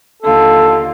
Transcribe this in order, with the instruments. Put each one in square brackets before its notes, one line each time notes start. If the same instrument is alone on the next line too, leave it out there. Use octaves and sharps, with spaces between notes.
[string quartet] D#2 D3 F4 [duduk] A4